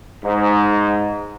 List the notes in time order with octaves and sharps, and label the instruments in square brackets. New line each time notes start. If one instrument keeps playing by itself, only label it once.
[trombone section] G#2